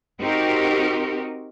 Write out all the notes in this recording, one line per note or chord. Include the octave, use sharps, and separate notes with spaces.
C4 D#4 F#4 G4 A#4